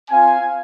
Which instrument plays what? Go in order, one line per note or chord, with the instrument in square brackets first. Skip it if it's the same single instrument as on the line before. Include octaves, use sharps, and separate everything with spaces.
[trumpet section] C4 F4 F5 G#5